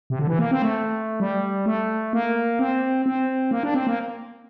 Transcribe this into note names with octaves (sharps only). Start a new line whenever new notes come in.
C3
D3
E3
A#3
C4
A3
G3
A3
A#3
C4
C4
A#3
D4
C4
A#3